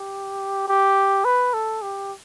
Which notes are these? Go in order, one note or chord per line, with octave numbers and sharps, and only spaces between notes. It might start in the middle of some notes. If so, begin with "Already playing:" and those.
Already playing: G4
G4
B4
A4
G4